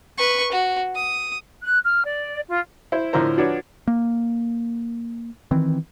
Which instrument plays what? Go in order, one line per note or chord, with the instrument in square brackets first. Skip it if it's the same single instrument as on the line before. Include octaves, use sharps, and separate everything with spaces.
[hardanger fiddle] B4 C#6
F#4
D#6
[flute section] F#6
F6
D5
F4
[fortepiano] E4 C5
A2 D3 F3 A#4 C5 A#5
F3 D4 F#4 B4 C#5
[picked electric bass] A#3
D#3 E3 C4